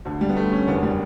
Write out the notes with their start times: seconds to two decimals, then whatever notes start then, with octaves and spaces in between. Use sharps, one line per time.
0.05 D2 D3
0.21 G3
0.29 B3
0.36 A3
0.52 C#4
0.67 F#1 E2 D3 B3
0.83 G3